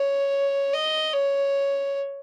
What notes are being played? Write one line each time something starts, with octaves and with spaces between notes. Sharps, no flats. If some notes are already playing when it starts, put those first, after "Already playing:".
Already playing: C#5
D#5
C#5